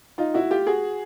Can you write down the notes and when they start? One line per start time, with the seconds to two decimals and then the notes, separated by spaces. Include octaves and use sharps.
0.18 D#4 F4
0.34 E4 F#4
0.50 F4 G4
0.67 F#4 G#4